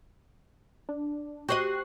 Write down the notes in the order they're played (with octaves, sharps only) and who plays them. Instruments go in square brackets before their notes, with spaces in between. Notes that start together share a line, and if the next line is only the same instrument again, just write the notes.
[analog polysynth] D4
[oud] F#4 C5 D#5 [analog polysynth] G4 F#6 C7